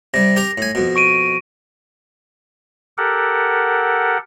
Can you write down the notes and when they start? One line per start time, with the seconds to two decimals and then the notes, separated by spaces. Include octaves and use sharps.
0.14 C3 G3 A#6
0.36 G4 A#4 A#5
0.58 A2 G#5
0.75 F2 B2
0.96 C#6 D7 D#7
2.98 G4 A4 A#4 F#5